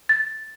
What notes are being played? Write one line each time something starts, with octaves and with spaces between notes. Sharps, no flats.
A6